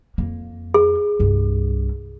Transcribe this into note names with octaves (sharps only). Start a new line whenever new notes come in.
F2 A#3
G#4
C2 G2